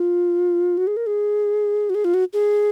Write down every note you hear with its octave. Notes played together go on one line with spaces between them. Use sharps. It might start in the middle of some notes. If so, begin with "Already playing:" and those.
Already playing: F4
F#4
G#4
A#4
G#4
F#4
G#4
F4
F#4
G#4